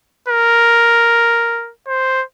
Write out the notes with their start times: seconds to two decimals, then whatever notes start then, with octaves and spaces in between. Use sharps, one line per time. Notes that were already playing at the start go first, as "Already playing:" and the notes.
0.28 A#4
1.87 C5